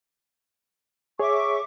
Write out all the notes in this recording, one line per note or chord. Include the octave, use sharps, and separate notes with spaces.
G#4 C#5 E5 C#6 D6